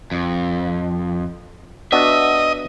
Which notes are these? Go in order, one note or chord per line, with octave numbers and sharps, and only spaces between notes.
F2
B3 D4 F#4 D#5 E5